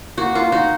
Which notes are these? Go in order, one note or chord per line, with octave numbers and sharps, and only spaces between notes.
A#3 F#4
A#3 F4
D#4 F#4